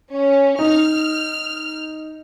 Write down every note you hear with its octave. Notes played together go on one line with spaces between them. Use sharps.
C#4
D#4 F6